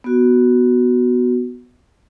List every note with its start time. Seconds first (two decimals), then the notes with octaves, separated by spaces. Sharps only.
0.04 B3 F#4